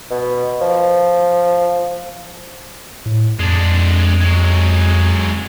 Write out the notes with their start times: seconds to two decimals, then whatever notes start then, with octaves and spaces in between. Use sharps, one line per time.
0.11 B2
0.61 F3
3.06 A2
3.39 F2 G#3 D4
4.21 F#3 G#3